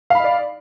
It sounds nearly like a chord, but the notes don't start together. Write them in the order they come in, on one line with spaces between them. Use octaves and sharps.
F5 B5 D#5 D5